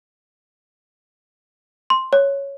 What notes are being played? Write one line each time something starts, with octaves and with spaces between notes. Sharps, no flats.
C6
C#5